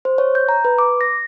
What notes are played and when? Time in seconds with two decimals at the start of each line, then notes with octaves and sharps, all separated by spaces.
0.05 C5
0.18 C#5
0.35 G6
0.49 A#5
0.65 B4
0.78 D6
1.01 A#6